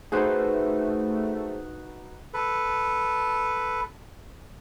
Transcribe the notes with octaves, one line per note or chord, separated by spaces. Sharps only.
A3 D#4 F#4 G#4 B4 C5
A4 B4